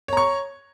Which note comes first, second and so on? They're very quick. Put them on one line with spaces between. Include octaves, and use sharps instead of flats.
C#5 A#5 C#6